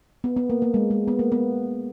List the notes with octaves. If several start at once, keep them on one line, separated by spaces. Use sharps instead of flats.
B3
B3
A#3
A#3
G#3
G#3
B3
A#3
B3